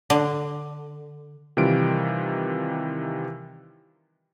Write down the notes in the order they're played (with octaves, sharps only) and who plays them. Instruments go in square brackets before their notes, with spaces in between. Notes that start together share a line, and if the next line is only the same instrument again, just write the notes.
[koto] D3
[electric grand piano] C3 D#3 E3 G3 F4 D7